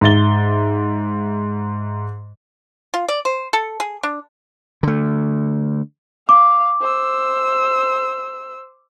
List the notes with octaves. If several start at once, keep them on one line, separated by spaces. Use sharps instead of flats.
G#2 E5 A6 G7
F4
D5
C5
A4
G#4
D4
D3 A3
F5 D6
C5 E6